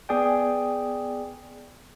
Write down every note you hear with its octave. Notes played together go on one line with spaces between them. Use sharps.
B3 G#4 D5 G5